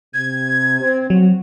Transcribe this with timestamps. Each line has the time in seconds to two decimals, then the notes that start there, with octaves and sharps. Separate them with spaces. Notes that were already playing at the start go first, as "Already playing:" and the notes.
0.14 C3 G#6
0.81 C4
1.10 F#3 C4 F#4